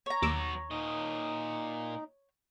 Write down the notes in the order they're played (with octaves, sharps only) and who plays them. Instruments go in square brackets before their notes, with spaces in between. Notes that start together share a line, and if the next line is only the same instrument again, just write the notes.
[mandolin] C#5 A#5
[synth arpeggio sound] D#2 D6 E6 [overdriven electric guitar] F#3 B3
[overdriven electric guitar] A#2 D#5 [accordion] D#4